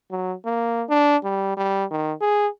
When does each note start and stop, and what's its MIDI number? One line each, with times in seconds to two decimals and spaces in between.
0.11 0.34 54
0.45 0.83 58
0.89 1.17 62
1.24 1.53 55
1.57 1.85 55
1.91 2.13 51
2.21 2.47 68